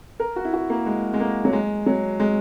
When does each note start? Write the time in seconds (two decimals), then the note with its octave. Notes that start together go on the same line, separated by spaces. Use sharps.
0.20 A#4
0.36 F#4
0.45 E4
0.53 F#4
0.70 A#3
0.86 G#3
1.14 G#3
1.20 A#3
1.45 F#3
1.53 G#3
1.86 F#3
2.20 G#3